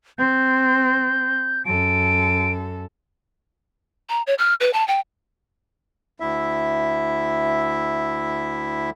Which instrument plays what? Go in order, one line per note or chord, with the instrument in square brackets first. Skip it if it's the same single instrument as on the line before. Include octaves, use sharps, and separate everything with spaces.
[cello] C4 [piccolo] G6
[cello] F#2 A4 [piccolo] D7
[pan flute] A#5
C#5
F6
B4
A5
G5
[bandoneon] D2 E4 E5